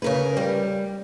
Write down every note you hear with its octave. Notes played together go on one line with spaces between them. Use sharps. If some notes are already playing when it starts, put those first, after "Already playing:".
C#3 A#4 B4
G3